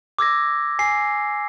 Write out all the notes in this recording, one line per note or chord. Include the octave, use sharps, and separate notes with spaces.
D6 E6 G#6 A#6
G#5 C7